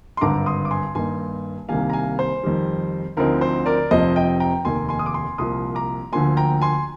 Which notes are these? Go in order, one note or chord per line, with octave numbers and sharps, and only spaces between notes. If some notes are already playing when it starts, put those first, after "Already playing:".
C6
G#1 G2 D3 A#5 D6
C6 D#6
D6
G#5 C6
G2 D#3 A#3 D#4 G#5 C6
C2 C3 D#3 G3 A#3 F5 G#5
A#5
F5 G#5
C5
F2 D#3 G3
D2 D3 F3 C4 D#4 A#4
C5
A#4 D5
F1 F2 C3 F3 C5 D#5
D#5 G5
G5 A#5
F1 D#2 D#3 A#3 G#5 C6
G#5 C6
D#6
D6
G#5 C6
C2 A#2 F3 A#3 C6 D#6
A#5 D6
D2 D3 F3 A#3 G#5 C6
G5 A#5
G#5 C6